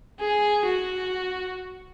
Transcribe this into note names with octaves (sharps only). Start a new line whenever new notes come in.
G#4
F#4